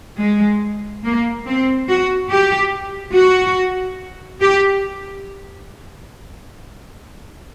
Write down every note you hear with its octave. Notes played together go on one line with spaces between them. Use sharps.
G#3
A#3
C4
F#4
G4
F#4
G4